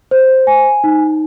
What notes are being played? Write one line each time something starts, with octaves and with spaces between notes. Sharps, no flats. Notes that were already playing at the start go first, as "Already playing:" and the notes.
C5
G#5
D#4